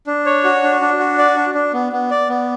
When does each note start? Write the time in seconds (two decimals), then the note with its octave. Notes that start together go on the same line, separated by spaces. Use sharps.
0.07 D4
0.26 C#5
0.44 F#4
0.63 D4
0.81 D4
0.99 F#4
1.18 D5
1.36 D4
1.55 D4
1.73 B3
1.92 B3
2.10 D5
2.29 B3